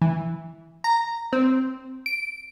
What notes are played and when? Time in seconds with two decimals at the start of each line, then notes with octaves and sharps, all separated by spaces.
0.02 E3
0.84 A#5
1.33 C4
2.06 D7